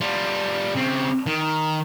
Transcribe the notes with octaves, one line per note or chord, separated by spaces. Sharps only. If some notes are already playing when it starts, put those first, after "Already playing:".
G3 F4
C#3 C4
D#3